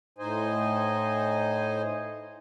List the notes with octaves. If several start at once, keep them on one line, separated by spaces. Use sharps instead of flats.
A2 D#4 C5 D#5 G#5